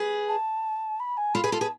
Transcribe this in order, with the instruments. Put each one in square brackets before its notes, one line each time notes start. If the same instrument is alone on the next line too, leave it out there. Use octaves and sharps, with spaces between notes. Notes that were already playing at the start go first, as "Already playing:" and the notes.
Already playing: [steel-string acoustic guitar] G#4 B4
[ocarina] A5
B5
G#5
[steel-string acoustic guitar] F4 A4 [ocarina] B5
[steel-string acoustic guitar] G#4 B4
[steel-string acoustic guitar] F4 A4 [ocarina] A5
[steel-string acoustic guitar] G#4 B4